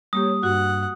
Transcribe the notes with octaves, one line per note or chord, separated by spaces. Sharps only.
G3 A#3 G4 C#5 D#6
G2 F#4 F#5